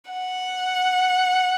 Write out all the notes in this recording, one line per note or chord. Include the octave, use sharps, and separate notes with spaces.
F#5